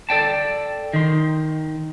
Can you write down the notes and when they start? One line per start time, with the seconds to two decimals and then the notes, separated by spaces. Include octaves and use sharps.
0.09 A4 D5 G5 A5
0.93 D#3 D#4 C6